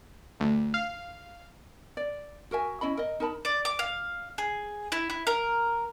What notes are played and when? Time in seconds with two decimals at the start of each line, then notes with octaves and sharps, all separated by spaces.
0.40 D2
0.74 F5
1.97 D5
2.51 F#4 A#4 E5 G#5
2.81 C#4 E4 D#5 B5
2.97 A#4 D#5
3.20 D#4 A#4 A5 B5
3.45 D5
3.65 D6
3.79 F5
4.38 G#4
4.92 E4
5.10 E4
5.27 A#4